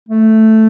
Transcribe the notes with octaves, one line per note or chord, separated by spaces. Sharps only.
A3